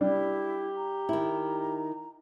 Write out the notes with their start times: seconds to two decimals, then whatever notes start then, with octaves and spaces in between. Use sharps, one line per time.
0.01 G3 D4 E4 G4
0.77 A#5
1.09 D#3 E4